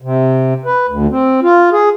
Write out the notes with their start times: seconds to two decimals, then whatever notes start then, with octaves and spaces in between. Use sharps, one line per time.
0.02 C3
0.65 B4
0.89 D2
1.11 C4
1.43 F4
1.73 G#4